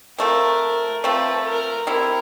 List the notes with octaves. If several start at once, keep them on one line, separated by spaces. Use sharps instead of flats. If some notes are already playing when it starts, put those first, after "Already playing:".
F3 A3 C4 A#4
F3 A3 C4 B4
A#4
G3 C4 E4 A#4